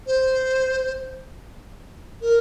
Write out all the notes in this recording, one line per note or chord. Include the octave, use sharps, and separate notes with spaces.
C5
A#4